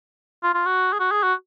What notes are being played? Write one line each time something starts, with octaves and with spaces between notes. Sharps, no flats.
F4
F4
F#4
G#4
F#4
G#4
F#4